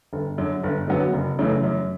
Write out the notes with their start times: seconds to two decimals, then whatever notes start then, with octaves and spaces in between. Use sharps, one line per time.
0.13 G1
0.37 F#2 D3
0.63 G1
0.88 F#2 D3 F#3 B3
1.13 F#1
1.39 F#2 C#3 E3 A3
1.64 F#2